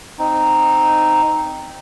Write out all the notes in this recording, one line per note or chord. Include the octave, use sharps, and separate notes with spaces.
C4 D#4